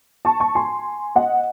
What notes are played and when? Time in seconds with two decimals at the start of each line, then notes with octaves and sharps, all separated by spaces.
0.25 A5 C#6
0.40 A5 C#6
0.55 G#5 C6
1.16 D#5 F#5